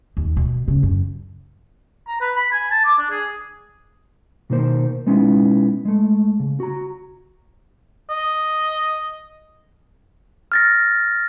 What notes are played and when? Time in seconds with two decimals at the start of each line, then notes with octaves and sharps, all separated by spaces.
0.17 D#2
0.37 B2
0.68 C#3
0.83 F#2
2.07 A#5
2.20 B4
2.36 B5
2.52 G#5
2.71 A5
2.84 D6
2.98 D4
3.10 G#4
4.50 B2 D#3 A#3 C5
5.06 B1 G#3 B3 C#4 D#4 E4
5.85 G#3 A3
6.40 C#3
6.60 F#4 A#5
8.10 D#5
10.52 F6 A6 A#6